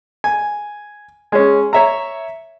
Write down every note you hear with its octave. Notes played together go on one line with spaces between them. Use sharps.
G#5
G#3 C#4
C#5 E5 A#5